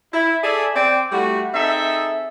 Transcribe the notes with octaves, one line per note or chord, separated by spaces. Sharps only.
E4
G#4 A4 D5 E5 G#5
C4 D5 G5
G3 A3 E4 F#4
C4 D#4 G#4 A4 E5